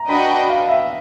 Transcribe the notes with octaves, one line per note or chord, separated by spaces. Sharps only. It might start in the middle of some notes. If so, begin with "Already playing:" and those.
Already playing: A#5
D4 F#4 B4 D#5 G5 B5
F5
E5